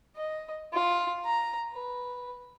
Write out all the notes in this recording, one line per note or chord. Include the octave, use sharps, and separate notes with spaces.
D#5
F4
A#5
B4